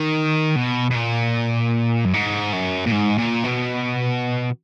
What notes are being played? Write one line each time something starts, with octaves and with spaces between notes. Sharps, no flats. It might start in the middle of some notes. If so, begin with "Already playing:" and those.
Already playing: D#3
B2
B2
A#2
F#2
G#2
F#2
A#2
G#2
A#2
B2